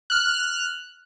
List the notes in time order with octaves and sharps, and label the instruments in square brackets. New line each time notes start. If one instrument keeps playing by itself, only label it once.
[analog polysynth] F6 F#6